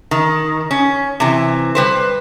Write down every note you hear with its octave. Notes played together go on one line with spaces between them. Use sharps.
D#3
C#4
C3 E3
G3 B4 C5